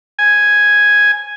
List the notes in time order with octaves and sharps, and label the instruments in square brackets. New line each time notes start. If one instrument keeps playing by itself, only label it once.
[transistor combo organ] G#5